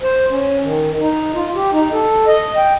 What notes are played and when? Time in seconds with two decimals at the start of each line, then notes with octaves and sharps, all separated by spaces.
0.01 C5
0.31 C#4
0.62 D#3
1.00 D#4
1.35 F4
1.55 G4
1.72 D#4
1.93 A4
2.27 D#5
2.57 G5